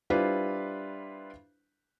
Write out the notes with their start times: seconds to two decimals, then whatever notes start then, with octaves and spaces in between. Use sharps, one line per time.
0.10 G3 D4 E4 F4 B4 C5